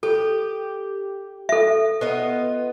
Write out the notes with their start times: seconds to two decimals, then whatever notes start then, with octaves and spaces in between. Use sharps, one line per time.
0.03 G4 A4
1.49 A4 E5
2.01 B3 F4 D#5